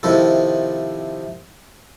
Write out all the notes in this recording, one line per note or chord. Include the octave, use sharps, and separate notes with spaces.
C3 D#3 F3 E4 A4